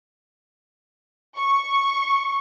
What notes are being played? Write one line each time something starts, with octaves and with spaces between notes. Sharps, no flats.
C#6